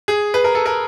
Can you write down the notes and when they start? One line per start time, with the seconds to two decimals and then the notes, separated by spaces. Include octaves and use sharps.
0.08 G#4
0.34 B4
0.44 A#4
0.55 A4
0.66 A#4